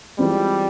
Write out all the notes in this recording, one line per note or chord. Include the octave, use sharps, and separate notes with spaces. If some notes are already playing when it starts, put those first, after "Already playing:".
E3 G3 G#3 C4 F4